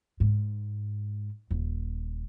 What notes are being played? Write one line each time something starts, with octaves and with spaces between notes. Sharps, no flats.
G#2
D#1